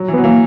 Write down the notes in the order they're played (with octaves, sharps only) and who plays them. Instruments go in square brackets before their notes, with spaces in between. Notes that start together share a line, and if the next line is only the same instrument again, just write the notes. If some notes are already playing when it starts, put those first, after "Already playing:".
Already playing: [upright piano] F#3
E3
[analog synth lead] B3
[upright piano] F#3
[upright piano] E3 [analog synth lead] A#3